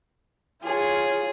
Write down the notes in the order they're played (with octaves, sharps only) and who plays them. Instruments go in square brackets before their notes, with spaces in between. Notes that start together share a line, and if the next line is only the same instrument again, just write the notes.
[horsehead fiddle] F4 C#5 [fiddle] G#4